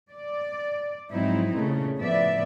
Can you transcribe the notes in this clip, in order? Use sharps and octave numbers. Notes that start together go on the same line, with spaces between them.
D5
G#2 F3 F#3 C4 D#4 E4
A#2 C#3 A3
A2 F3 B3 D5 E5